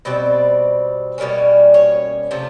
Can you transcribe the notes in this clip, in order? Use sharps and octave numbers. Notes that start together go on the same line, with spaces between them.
B2 G3 C4 D5
B2 G3 A#3 C#4
C#5
C3 F3 A3